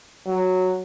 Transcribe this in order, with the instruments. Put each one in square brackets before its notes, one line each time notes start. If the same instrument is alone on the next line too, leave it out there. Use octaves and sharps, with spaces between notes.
[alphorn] F#3